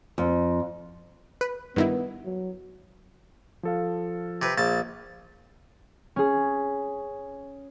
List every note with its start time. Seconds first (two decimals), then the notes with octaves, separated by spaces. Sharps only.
0.18 F2
1.41 B4
1.76 G2 D#3 B3 E4
2.25 F#3
3.63 F3 A4 F5
4.42 C3 B4
4.58 A#1 A5
6.16 C#4 G#4